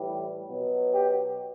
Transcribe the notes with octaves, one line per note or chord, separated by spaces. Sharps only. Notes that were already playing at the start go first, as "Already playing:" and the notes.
Already playing: A2 E3 G3
B2 F#3
G4